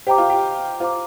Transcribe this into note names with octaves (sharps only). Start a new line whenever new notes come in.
G4 C5 D#5 G5 A#5 D6
F4
G4
F4 C5 F5 A#5 D6